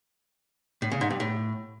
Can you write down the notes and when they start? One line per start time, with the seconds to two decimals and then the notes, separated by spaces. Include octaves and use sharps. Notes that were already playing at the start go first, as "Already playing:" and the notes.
0.82 A2
0.92 C#3
1.01 G#2
1.10 G2
1.20 A2